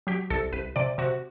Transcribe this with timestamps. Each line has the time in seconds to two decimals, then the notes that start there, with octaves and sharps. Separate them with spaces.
0.07 F#3 G4
0.30 C2 A4
0.53 C2 B4
0.76 C3 D5
0.98 C3 F#4